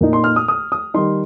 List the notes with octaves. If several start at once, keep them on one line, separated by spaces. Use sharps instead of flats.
A#2 A#3 D#4
C6
F6
D#6
D#6
D#6
D#3 G3 D#4 C6